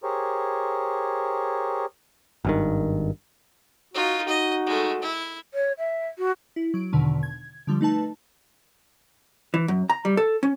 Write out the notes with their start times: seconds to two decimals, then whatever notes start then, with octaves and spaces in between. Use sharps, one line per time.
0.03 G4 G#4 A#4 C5 C#5
2.45 G#1 G2 D#3
3.94 D#4 F4 F#4
4.28 D#4 F#4 D#5
4.66 G#3 A3
5.02 E4
5.54 C#5
5.78 E5
6.18 F#4
6.56 E4
6.74 F#3 D7
6.93 E2 B2 D3 D#3
7.23 G#6
7.67 D3 F3 G3
7.81 A3 D#4 B4 A5
9.54 E3
9.68 F#2
9.90 A#5
10.05 G3
10.17 A4
10.43 C#4